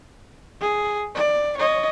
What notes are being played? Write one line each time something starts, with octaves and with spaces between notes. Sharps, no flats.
G#4
D5
C#5 D#5